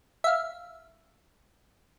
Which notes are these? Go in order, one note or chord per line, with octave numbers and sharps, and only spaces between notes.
E5 F5